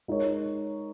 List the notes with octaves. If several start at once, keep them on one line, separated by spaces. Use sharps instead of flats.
G#3 D#4 A#4 C#5